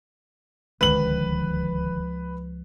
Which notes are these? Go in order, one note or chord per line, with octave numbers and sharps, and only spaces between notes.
D1 C#2 D3 D#3 F3 B4 F#7